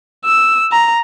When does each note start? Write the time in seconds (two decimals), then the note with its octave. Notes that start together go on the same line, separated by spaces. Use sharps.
0.25 E6
0.72 A#5